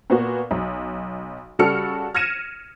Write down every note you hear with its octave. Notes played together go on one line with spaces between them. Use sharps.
A#2 B3 F#4
B1
C#3 G3 F#4 A4 F6 C#7
F6 G#6 A#6 C#7 D#7 E7